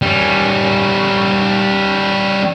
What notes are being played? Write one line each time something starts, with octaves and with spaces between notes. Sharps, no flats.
G3 C#4